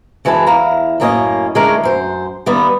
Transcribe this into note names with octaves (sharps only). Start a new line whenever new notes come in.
F#2 E3 G#3 C#4 B4 A5
E2 E4 F5 A#5
F#2 A2 A#3 C#4 G#4 D#5
D3 G#3 A3 C#4 A#4
F#2 C5
D#3 G3 A#3 B3 D#4